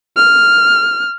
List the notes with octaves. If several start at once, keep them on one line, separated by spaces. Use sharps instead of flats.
F6